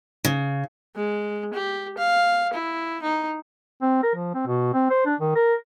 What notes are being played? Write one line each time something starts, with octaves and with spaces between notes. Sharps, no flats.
C#3
G#3
G4
F5
E4
D#4
C4
A#4
F3
C4
B2
C4
C5
D4
D#3
A#4